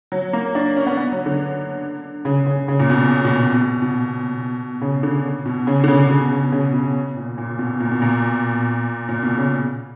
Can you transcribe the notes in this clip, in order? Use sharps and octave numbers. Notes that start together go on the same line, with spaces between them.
F#3
A#3
D4
C#4
B3
B3
F#3
D3
C#3
C#3
C#3
A#2
B2
B2
B2
B2
B2
C#3
D3
B2
C#3
D3
C#3
B2
C#3
C#3
B2
A#2
A#2
B2
A#2
B2
A#2
A#2
B2
C#3